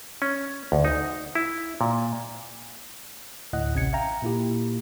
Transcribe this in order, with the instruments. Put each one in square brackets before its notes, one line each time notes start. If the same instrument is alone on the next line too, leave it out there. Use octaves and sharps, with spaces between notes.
[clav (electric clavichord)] C#4
D2
D#4
E4
A#2
[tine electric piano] D2 A2 D#5 F#5 F#6
A1 C3 C#4 G#6 C#7
E5 F5 G5 A#5
A#2 A#3 E4 G4